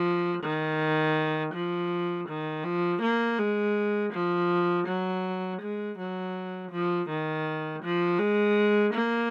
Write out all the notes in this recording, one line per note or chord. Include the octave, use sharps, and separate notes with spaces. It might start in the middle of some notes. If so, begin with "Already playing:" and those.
Already playing: F3
D#3
F3
D#3
F3
A#3
G#3
F3
F#3
G#3
F#3
F3
D#3
F3
G#3
A#3